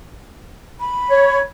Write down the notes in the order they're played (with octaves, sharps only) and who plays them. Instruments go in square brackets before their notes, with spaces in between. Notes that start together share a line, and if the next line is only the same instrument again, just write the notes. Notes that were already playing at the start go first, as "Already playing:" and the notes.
[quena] B5
[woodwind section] C#5